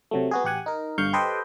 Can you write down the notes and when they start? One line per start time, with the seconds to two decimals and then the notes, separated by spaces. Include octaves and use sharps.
0.11 C3 F#3 A3
0.31 B3 F#4 G#4
0.44 A1 G4 F#5 G#5
0.66 D#4 A#4
0.98 G1 G2 D3 F5 C#6 G6
1.13 G4 A4 B4 C5 D#5 G5